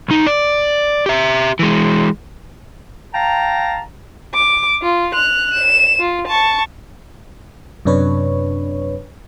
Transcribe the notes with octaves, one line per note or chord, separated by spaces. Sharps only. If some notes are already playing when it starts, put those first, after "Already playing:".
B1 D#4
D5
G4 E5
E3 G#3
F5 G5 A5 A#5
D6
F4
F#6 F7
E7
F4
A5 C#6
F#2 C3 D4 B4 C#5